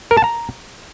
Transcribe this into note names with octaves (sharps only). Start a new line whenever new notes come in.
A#4
A5
A#5